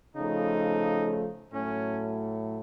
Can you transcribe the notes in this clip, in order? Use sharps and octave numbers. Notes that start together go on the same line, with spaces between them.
C#3 F3 A3 D#4
A2 F#3 A3 C#4